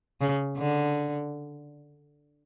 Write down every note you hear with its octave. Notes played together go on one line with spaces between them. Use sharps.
C#3
D3